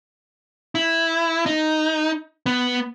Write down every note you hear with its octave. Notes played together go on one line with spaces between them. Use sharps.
E4
D#4
B3